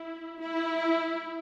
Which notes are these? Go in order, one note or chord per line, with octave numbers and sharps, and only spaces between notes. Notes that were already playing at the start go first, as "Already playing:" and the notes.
Already playing: E4
E4